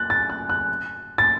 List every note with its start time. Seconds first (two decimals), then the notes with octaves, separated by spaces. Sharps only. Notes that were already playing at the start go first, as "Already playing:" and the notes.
Already playing: F#6 A6
0.10 A6
0.30 F#6
0.50 F#6
1.18 A6